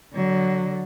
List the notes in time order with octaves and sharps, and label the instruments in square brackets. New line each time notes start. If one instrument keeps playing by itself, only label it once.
[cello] D3 F#3